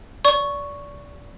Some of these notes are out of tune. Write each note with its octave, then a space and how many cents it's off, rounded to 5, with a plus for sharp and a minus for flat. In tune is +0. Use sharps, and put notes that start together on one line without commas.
D5 -25 C#6 +0